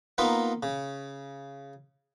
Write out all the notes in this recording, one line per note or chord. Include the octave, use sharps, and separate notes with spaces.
A#3 B3 D#4 F4 B4
C#3